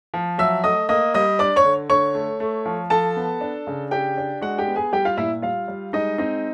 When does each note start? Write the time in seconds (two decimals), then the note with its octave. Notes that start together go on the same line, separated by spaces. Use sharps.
0.14 F3
0.38 F#3 E5 E6
0.64 A3 D#5 D#6
0.89 A#3 D#5 D#6
1.14 G3 D#5 D#6
1.39 D4 D5 D6
1.56 C#5 C#6
1.65 D3
1.89 D3 C#5 C#6
2.15 A3
2.40 A3
2.66 F3
2.90 F3 A4 A5
3.16 B3
3.41 D4
3.67 C#3
3.91 D4 G4 G5
4.17 D4
4.41 G#3 F#4 F#5
4.58 G4 G5
4.67 B3
4.76 G#4 G#5
4.93 G3 G4 G5
5.05 F4 F5
5.17 A#2 E4 E5
5.42 G3 F4 F5
5.68 G3
5.93 G#3 D#4 D#5
6.18 C4 D#4 D#5